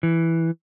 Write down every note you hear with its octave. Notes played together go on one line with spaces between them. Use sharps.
E3